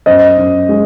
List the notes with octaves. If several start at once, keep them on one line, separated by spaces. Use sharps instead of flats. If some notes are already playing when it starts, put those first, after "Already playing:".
F#2 C5 D#5
F#2
G#3